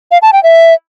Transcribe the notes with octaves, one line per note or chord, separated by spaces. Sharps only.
F5
A5
G5
E5